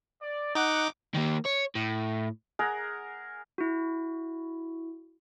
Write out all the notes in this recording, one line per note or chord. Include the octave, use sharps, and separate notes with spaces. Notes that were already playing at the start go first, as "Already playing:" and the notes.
D5
D#4 F#5 D6
D#3 A#3
C#5
A2
G#4 A#4 F#5 A#5
E4 F#4